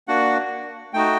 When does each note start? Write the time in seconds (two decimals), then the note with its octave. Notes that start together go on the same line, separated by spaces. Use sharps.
0.08 A#3 D4 F#4 F#5
0.93 A3 D#4 F#4 G5